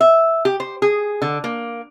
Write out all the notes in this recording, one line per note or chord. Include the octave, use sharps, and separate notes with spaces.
E5
G4
C5
G#4
D3
A#3